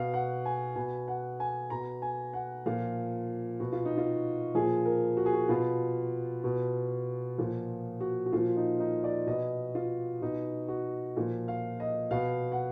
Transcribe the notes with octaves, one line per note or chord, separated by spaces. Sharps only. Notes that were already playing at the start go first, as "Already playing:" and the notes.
Already playing: B2 F5
F#5
G#5
B2 G#5
F#5
G#5
B2 A#5
G#5
F#5
A#2 F3 F5
B2 F#4
F4
D#4
F4
A#2 F3 G#4
A#4
F#4
G#4
F#4
B2 F4
B2
A#2 F3
F#4
F#4
A#2 F3 F4
D#4
D#4
D5
B2 D#5
F4
B2 D#4
F#4
A#2 F3
F5
D#5
B2 F5
F#5